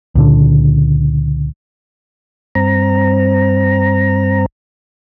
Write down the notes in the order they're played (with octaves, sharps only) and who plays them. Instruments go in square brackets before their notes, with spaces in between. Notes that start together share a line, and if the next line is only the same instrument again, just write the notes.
[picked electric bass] C#2 A#2 D3
[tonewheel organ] G2 C4 A#5